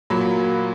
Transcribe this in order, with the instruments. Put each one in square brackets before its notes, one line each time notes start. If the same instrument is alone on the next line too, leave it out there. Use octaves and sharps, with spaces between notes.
[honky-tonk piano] A#2 F#3 A#3 B5